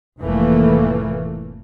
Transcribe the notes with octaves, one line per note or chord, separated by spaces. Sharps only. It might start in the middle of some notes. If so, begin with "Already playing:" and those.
F1 A2 E3 A3 A#3